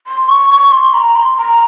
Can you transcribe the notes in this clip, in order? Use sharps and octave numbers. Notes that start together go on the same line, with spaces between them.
C6
C#6
C#6
C6
A#5
C6
A#5